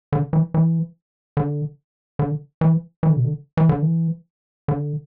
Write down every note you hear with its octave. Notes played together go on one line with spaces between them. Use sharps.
D3
E3
E3
D3
D3
E3
E3
D3
B2
D3
E3
D3
E3
D3